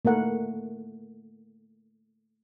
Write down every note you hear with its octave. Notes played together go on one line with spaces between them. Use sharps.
A3 A#3 A#4 F#5